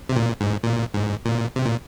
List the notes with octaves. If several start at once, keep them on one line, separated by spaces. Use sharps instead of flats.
C3
A#2
G#2
A#2
G#2
A#2
C3
A#2